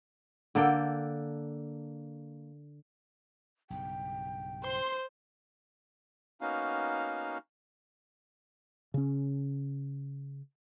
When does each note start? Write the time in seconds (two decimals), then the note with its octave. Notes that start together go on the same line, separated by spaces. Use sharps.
0.55 D3 A#3 A4 G5
3.70 B1 G2 C#3 G5
4.64 C5 C6
6.41 A#3 B3 C#4 D#4 F#4 F5
8.94 C#3 C#4